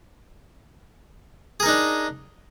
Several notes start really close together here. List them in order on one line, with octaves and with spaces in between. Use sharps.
G#4 A#4 D#4 D4